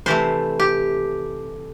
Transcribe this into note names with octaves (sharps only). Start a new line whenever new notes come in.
C3 E3 A3 C5
G4